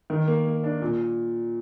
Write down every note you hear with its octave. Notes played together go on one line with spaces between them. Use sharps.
D#3
A#3
A#3
D4
A#2